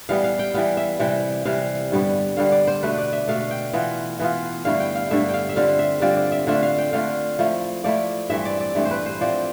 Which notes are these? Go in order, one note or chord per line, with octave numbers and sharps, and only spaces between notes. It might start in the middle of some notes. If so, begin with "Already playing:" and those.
E3 G3 B3 F5
F5
G5
E3 G3 B3 F5
E5
C3 E3 G3 G5
C3 E3 G3 F5
G2 D3 G3 B3
G2 D3 G3 B3 F5
D5
C5
B2 A3 D4 B4
D5
E5
B2 A3 D4 F5
G5
E3 B3 F4
E3 B3 F4
G2 D3 A3 E4 F5
G5
F5
G2 D3 A3 E4 E5
F5 G5
E5
D3 G3 C4 F4 F5
E5
D3 G3 C4 F4 D5
D5
E5
D3 A3 D4 F4 E5
F5
G5
D3 A3 D4 F4 F5
F3 A3 E4
F3 A3 E4 D5
G2 E3 A3 C4 E5
D5
D5
G2 E3 A3 C4
C5
B4
C5
F3 C4 E4 D5